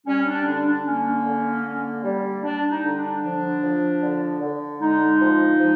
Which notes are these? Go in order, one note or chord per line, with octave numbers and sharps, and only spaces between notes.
G3 C#4
D4
D3 D4
D4
A#3 C#4
D3
A#3
G3
G3 D4
D#4
D3
D4
F3 D4
F3
D3
D3
G#3 D#4
F3
F3